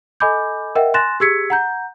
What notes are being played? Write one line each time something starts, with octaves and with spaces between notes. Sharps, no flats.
A4 D#5 G#5 B5 D6 G6
A#4 D#5 E5 F#5 G5
G#5 C6 F#6 A6 A#6 E7
G4 G#4 E6 G#6 B6 C#7
F#5 A#5 G6